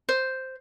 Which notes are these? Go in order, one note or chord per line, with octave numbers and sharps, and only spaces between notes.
C5